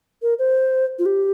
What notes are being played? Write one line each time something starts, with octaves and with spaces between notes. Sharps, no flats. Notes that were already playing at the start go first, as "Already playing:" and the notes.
A#4
C5
F4
G4